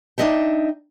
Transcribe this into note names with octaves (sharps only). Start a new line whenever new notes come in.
D4 D#4 A4 D#5 E5 G5